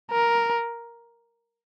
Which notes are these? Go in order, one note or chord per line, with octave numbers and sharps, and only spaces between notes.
A#4